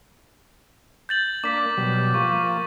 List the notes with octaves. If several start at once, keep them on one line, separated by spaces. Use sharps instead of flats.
G6 A6 F#7
A#3 D4 D6 B6
B2 F#3 G3
F3 A#3 C#6
C#6